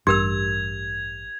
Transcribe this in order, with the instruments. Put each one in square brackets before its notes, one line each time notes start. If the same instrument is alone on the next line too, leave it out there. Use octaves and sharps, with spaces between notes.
[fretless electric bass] A1 [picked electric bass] G2 [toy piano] G4 A#4 E6 [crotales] G#6 F7